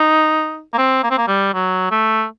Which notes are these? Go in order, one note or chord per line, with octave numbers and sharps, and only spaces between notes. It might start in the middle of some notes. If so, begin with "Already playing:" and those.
Already playing: D#4
A#3
C4
A#3
C4
A#3
G3
F#3
A3